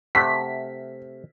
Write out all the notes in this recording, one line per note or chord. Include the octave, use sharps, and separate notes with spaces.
C3 A3 F#5 B6